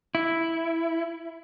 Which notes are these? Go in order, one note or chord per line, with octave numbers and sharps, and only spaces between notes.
E4